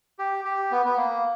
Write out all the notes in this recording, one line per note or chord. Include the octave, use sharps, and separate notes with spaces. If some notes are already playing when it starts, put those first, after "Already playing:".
G4
G4
B3
B3
A#3